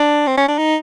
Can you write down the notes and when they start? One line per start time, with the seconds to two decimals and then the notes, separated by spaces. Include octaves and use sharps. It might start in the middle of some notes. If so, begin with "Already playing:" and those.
Already playing: D4
0.27 C4
0.37 C#4
0.48 D4
0.58 D#4